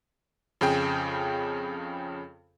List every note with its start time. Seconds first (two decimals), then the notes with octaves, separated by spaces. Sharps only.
0.61 F2 C#3 G#4 G5